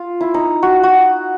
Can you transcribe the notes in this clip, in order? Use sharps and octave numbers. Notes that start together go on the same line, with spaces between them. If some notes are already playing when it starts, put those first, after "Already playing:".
Already playing: F4
E4
D#4
F#4
F#4